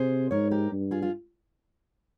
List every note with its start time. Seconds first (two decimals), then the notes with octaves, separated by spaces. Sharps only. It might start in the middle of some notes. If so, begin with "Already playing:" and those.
Already playing: C3 G#4 C5
0.31 G#2 A#4 C#5
0.51 G4 A#4
0.72 G2
0.91 F4 G#4
1.02 F4